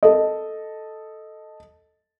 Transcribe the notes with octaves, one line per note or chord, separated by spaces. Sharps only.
A4 D#5